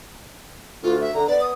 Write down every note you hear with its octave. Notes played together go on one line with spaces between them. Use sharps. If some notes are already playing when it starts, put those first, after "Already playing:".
D2 F4
E5
D3 A#5
B3 D5
D#6